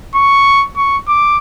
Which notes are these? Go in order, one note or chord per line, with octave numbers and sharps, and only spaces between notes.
C#6
C#6
D6